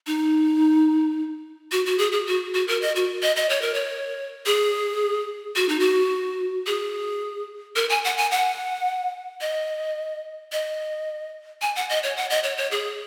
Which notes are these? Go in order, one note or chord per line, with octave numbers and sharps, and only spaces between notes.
D#4
F#4
F#4
G#4
G#4
F#4
F#4
A#4
D#5
F#4
D#5
D#5
C#5
A#4
C#5
G#4
F#4
D#4
F#4
G#4
A#4
G#5
F#5
G#5
F#5
D#5
D#5
G#5
F#5
D#5
C#5
F#5
D#5
C#5
C#5
G#4